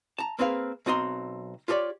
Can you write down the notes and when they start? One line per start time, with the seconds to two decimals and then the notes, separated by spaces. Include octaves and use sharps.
0.18 A5 A#5
0.39 A#3 C4 G#4 B4 C#5 F5
0.86 B1 C4 F#4 D#5 A#5 C6
1.68 F4 G4 A4 C#5 D5